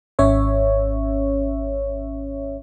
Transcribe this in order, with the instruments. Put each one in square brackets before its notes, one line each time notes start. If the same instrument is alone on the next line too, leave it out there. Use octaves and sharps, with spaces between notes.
[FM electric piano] G#1 C#4 C#5 E5